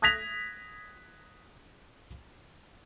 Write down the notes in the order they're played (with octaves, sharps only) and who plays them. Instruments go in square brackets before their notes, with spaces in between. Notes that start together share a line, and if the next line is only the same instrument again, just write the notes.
[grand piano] D#6 F#6 G#6 A#6 B6 F7